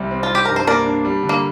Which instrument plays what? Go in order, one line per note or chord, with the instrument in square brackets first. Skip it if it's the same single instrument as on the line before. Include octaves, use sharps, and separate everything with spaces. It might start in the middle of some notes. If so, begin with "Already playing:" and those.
Already playing: [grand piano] C2 C3 G3
C4
[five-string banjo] F4
[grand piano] G3 [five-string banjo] G4
[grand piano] G2 [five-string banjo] A#4
[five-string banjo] C5
[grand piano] A#3 [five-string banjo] A#4 D5
[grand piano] D4
G3
D3
[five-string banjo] A#3